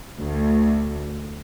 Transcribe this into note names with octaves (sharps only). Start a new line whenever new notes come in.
D2